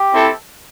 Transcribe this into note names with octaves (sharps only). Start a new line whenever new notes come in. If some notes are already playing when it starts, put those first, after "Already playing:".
Already playing: G4
C4 E4 A4